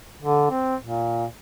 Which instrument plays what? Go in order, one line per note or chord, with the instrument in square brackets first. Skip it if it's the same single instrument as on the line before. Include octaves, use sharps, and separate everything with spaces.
[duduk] D3
C4
A#2